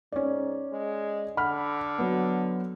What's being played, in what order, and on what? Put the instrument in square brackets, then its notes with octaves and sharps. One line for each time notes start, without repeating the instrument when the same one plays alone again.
[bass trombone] G#2 [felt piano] C#4 D5
[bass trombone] G#3
[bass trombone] D3 [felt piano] F#5 B5 F6
[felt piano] F#3 B3